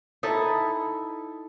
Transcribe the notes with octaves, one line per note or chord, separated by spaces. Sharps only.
D#4 E4 A4